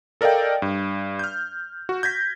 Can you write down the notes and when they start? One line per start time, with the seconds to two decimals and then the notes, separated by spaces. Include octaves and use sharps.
0.21 A4 A#4 D5 D#5 F5 G5
0.62 G2
1.19 F6 G6
1.89 F#4
2.03 G6 G#6 A#6 B6